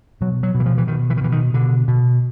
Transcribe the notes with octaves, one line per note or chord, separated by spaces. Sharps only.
B2 F#3
F#3
B2
E3
F3
E3
B2 D#3
E3
D#3
B2 E3
D#3
B2 D3
B2